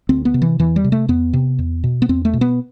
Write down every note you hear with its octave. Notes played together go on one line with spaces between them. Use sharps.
D2 C4
B3
C3
E3
E2 E3
G3
C3
A3
E2 B3
C3
E2
B2
B3
E2 C4
A3
B2
B3